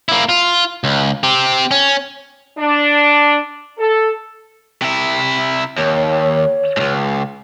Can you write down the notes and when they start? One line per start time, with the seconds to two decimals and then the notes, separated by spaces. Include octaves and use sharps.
0.09 A#3 E4
0.29 F4
0.84 C#2
1.24 C4 G4
1.71 C#4
2.58 D4
3.79 A4
4.82 C3 E4
5.78 D#2 C#5
6.77 C#2 G#2